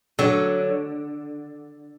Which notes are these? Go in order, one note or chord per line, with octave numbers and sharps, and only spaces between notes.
D3 F#3